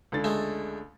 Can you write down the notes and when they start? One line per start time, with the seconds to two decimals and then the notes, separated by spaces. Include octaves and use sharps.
0.12 C#2 D3 A6
0.24 G#3 A3